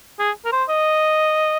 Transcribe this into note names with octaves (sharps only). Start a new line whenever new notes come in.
G#4
A#4
C5
D#5